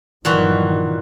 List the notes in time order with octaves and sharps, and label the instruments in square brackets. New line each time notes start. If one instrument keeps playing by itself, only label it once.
[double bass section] G1 D#3 F#3 [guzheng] A#2 E3 F#4